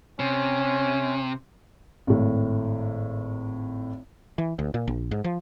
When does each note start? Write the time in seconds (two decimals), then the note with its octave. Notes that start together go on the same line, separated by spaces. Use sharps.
0.20 C3 C#4
2.07 G#1 A2
4.38 E3
4.59 D2
4.74 A#2
4.88 A#1
5.11 G#2
5.24 F3